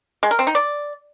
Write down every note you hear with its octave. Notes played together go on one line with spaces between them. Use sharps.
G#3
A#4
C4
D#4
D5